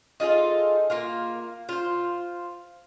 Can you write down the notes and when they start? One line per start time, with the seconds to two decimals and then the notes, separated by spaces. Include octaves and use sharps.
0.20 D#4 F4 G#4 A4
0.90 A#3 F4 A#4
1.69 F4 C5